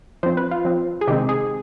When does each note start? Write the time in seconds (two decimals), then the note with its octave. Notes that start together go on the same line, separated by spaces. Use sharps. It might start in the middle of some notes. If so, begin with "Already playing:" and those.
0.23 F3 C4 C5
0.37 B4
0.51 F4
0.65 F3 C4
1.01 G#4
1.07 C3 D#3 G#3 C4 G4
1.29 G#4